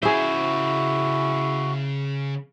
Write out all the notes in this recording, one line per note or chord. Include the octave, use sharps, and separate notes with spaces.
C#3 E4 F#4 G#4 C5 E5